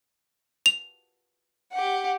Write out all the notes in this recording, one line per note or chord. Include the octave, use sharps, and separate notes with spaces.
F7
G4 F#5